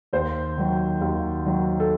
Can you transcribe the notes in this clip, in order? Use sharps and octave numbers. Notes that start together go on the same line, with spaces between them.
D#2 C5
D#3 F#3
D#2
D#3 F#3
A4